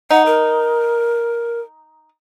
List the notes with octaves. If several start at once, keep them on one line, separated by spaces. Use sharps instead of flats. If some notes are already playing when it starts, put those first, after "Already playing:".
D#4 F#5
A#4